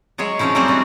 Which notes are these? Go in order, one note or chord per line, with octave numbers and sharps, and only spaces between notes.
F#3 G#3 G#4 C#5 E5
F3 C4 C#4 D#4 E4
F#3 G3 A3 C4 G4 G#4
G3 D4 F#4